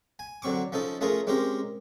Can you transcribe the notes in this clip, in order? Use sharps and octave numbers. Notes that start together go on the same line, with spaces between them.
G#5
D3 F#3 C4 C#6 D6
F3 C#4 D#4 A4
A3 C#4 F4 G#4 A#4
G#3 C4 C#4 G4 A#4